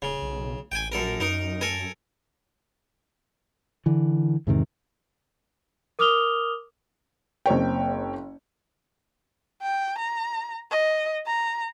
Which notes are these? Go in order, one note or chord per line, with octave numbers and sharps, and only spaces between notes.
D#1 C#3
B1
A1 G5 G#5
A#1 F#2 A4 A#4
F#2 D#4 A#4
A4 A#4 G#5
D3 E3
E2 G#2 C3 D#3
A#4 D6 D#6 F6 F7 G7
F#1 C4 C#5 G5
G5
A#5
D#5
A#5